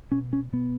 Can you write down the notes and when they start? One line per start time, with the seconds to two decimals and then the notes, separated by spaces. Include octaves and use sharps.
0.12 B2 C#4
0.33 C#4
0.52 B2 B3